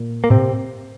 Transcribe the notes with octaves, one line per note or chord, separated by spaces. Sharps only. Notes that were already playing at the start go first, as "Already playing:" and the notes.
Already playing: A#2
A#3
A2 C3 C4